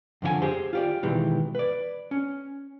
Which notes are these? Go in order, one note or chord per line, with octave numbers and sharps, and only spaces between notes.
F2 D3 F#4 G#5
G4 G#4 C5
F4 G4 D5
B2 D#3 E3 G#3 G4
B4 D5
C#4